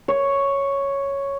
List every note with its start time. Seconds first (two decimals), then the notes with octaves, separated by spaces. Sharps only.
0.08 C#5